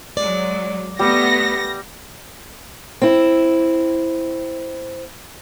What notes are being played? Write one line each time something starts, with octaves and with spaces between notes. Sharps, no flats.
F#3 G#3 D5
G3 A3 B3 A#6
C4 E4